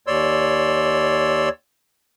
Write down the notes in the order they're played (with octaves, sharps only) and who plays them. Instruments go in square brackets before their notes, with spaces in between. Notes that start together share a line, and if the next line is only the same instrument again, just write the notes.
[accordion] D#2 C#5 D5 C6 E6